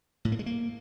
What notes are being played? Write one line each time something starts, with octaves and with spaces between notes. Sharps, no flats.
A2
A#3
G#3
A#3